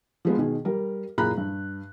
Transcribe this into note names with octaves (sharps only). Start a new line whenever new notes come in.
F3 G#3 B3
B2 D#3 G#4
G3 A#4
F#1 A#2 G#4 A#5 B5 F#6
G2